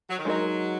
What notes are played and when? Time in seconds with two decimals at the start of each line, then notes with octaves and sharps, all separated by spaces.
0.09 F#3
0.18 D#3
0.25 F#3 G#3 D#4 A#4 D#5